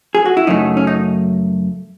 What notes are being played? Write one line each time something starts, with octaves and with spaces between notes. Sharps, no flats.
G#4
F#4
E4
F#2 C#3 F#3 A3 D#4
C#4
D#4